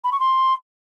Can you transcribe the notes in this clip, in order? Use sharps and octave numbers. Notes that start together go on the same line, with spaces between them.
B5
C#6
C6